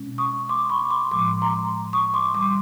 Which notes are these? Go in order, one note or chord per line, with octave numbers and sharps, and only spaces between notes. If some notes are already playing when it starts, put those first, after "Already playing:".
Already playing: B2 G#3 C#4
C#6 D#6
C6 D6
B5 C#6
C6 D6
A2 F3 G#3 C6 D6
A#5 C6
C#6 D#6
C6 D6
E3 G3 C6 D6